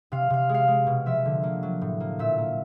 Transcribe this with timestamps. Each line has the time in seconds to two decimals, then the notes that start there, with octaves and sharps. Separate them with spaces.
0.12 C3 F5
0.30 C3 F5
0.49 G#3
0.54 F5
0.68 G#3
0.87 B2
1.06 F3 E5
1.25 D3
1.43 A#3
1.63 F#3
1.81 A2
2.00 A#3
2.19 A#2 E5
2.38 A#3